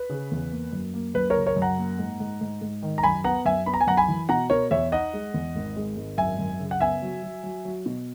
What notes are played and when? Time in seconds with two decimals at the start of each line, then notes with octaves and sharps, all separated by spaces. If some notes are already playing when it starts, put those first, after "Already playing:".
Already playing: B4
0.10 C#3
0.31 E2
0.51 A#3
0.73 F#2
0.94 A#3
1.14 F#2 B4
1.30 A#4 C#5
1.36 C#3
1.46 A#4 C#5
1.56 F#2
1.62 F#5 A#5
1.78 A#3
1.99 G#2
2.20 G#2
2.41 G#2
2.61 G#2
2.82 D#3
2.98 A#5
3.03 F#2 G#5 B5
3.24 B3 F#5 A#5
3.45 F#2 E5 G#5
3.66 B3 B5
3.74 A#5
3.81 G#5
3.87 F#2 F#5 A#5
3.97 G#5 B5
4.08 E3
4.29 B2 F#5 A#5
4.50 B2 A#4 C#5
4.71 E2 C#5 E5
4.92 D#4 D#5 F#5
5.13 G#3
5.34 E2
5.55 G#1
5.76 G#3
5.97 G#1
6.18 F#2 E5 G#5
6.39 F#2
6.60 C#3
6.71 F#5
6.80 B3 E5 G#5
7.02 F#3
7.23 F#3
7.43 F#3
7.65 F#3
7.86 B2